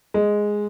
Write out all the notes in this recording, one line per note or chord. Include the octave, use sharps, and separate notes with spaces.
G#3